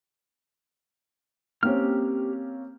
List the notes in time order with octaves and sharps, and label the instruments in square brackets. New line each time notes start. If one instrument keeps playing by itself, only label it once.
[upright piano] A#3 C4 C#4 [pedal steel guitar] G4 F6